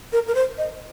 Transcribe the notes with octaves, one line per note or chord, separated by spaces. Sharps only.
A#4
A#4
C5
D#5